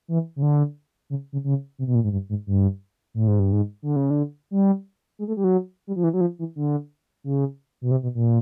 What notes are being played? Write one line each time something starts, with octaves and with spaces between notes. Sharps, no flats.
E3
C#3
D3
C#3
C#3
C#3
C3
B2
A#2
G#2
G2
G#2
G2
A2
G#2
G2
G#2
D3
C#3
D3
G3
G#3
A3
G3
F#3
G3
F3
E3
F#3
F3
E3
D3
C#3
B2
C3
B2
A#2